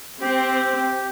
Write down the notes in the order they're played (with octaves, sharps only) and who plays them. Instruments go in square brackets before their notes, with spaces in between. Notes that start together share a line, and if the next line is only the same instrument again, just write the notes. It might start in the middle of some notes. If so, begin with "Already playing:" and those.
[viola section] C4 [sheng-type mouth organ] G4